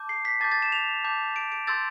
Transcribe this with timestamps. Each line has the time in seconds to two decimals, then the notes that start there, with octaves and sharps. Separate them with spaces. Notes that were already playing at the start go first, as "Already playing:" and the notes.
Already playing: A5 D6 G6
0.09 C7
0.25 B6
0.40 A5 D6 G6 A6
0.51 A6
0.62 E7
0.72 F7
1.04 A5 D6 G6
1.36 D7
1.52 D7
1.67 C6 E6 G6 A6